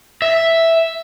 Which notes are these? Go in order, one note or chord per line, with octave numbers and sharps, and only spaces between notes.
E5